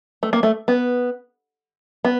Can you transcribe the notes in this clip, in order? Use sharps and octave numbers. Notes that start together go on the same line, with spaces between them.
A3
A#3
A3
B3
B3